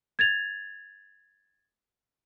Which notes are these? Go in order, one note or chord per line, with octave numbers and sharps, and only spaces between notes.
G#6 A6 F7